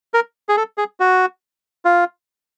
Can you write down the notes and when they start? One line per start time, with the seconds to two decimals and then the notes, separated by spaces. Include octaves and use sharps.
0.14 A#4
0.49 G#4
0.57 A4
0.78 G#4
1.00 F#4
1.85 F4